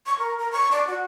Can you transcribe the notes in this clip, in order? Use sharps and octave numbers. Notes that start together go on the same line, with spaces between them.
C#6
A#4
A#4
C#6
D5
F#4